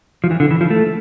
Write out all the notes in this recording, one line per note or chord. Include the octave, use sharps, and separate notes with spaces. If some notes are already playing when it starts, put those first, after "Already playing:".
F3
E3
D3
E3
F3
A3